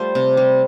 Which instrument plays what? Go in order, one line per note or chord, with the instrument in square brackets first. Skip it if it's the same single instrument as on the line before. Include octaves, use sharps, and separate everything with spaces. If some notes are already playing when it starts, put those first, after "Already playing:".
Already playing: [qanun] G3 A3 F4 A4 C5
C3
G3